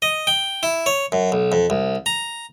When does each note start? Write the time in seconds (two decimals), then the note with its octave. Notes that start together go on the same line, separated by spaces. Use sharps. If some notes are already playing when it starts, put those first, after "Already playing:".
0.02 D#5
0.27 G5
0.63 E4
0.86 C#5
1.12 F#2
1.32 B1
1.52 F2
1.70 C2
2.06 A#5